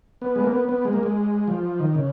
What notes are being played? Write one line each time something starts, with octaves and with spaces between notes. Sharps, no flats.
B3
G#3
A#3
B3
B3
G#3
A#3
G#3
F3
D#3
C#3